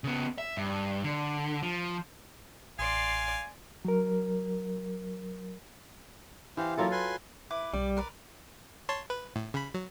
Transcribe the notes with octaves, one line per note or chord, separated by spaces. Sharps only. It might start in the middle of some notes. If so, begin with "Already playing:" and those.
C#3 B3
E5
G2
D3
F3
A1 D5 F5 G#5 C6
F#3 A#4
E3 G4 C5 F5
F#3 A#3 E4 F4 A4 A#4
B4 G#5 C6
E4 B4 D6
B1 G3 D5
A#4 B4 D5
C#5 A5 C6
B4
A2
C#3 B5
F#3